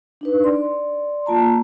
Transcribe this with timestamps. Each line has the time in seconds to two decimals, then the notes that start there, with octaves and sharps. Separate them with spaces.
0.21 D4 D#4 B4
0.44 D5 C6
1.26 A#3 F4 A5 A#5